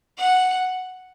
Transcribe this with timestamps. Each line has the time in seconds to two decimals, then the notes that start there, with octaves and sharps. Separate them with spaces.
0.18 F#5